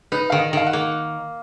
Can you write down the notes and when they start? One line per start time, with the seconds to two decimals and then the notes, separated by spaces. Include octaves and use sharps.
0.12 D#4 B4
0.30 D#3 F5
0.39 D#5
0.53 D#3 F5
0.67 F#5
0.73 A#3